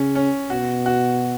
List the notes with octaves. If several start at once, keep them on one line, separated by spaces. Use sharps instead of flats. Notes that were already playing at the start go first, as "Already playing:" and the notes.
Already playing: C#3 C#4
C#4
B2 F#4
F#4